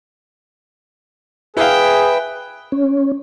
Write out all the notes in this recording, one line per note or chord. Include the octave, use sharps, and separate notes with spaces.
E4 G#4 B4 E5 F5 G5
C#4